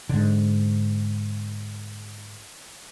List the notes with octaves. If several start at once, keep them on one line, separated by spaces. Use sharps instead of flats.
G#2 D3